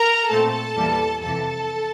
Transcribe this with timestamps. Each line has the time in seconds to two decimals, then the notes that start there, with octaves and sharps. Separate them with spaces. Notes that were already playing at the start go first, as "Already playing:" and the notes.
Already playing: A#4 A#5
0.30 A#2 A3 C4 A4 A5
0.76 E2 E3 G3 A#3
1.22 F2 C3 E3 A4 A5